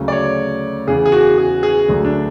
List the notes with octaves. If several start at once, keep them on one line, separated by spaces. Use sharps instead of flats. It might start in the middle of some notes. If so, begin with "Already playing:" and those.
Already playing: D2 C#3 F#3
D5
C#5
E2 C#3 E3 G#4
G#4
F#4
G#4
G#4
D2 D3 F#3
D4